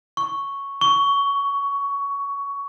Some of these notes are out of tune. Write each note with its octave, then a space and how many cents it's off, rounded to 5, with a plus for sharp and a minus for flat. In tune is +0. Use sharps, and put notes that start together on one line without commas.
C#6 +0
C#6 +15